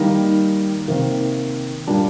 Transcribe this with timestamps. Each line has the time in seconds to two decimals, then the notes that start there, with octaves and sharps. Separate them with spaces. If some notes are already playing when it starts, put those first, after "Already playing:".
Already playing: D#3 G3 A#3 D#4 A#4
0.88 C3 D#3 A#3
1.87 A#2 G3 A#3 D4